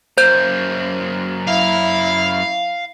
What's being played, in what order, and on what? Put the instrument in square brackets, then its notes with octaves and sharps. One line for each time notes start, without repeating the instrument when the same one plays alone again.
[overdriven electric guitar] F#2 A#3 [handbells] C5 G6
[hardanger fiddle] E4 [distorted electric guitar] F5